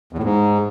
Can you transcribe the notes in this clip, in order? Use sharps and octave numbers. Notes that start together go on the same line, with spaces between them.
E2
A2
G#2